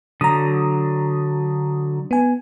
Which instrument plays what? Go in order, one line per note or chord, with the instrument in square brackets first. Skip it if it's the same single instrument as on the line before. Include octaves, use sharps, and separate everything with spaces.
[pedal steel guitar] D3 F#3 [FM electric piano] A#5 D#6
[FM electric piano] B3 G#5